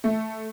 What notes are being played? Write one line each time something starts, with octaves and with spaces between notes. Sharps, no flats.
A3